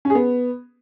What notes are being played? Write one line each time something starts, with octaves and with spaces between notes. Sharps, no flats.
C#4
G#4
B3